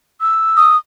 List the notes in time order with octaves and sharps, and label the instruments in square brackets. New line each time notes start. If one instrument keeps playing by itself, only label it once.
[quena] E6
[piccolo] D#6